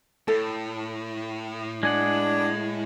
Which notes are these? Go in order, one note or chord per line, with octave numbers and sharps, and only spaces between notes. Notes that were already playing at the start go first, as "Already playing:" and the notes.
A2 A4
G#3 D4 G#4 F#5